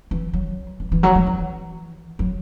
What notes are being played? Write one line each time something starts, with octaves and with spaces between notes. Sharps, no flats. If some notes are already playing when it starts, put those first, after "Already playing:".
E3
F#3
E3
E3
F#3
F#3
E3
F#3